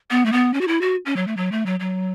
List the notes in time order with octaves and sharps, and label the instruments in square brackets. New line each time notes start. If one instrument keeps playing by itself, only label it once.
[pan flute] B3
A3
B3
C#4
F#4
E4
F#4
C#4
F#3
A3
F#3
A3
F#3
F#3